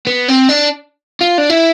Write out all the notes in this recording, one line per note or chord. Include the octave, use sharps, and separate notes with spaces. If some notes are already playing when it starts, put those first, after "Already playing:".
B3
C4
D4
F4
D4
E4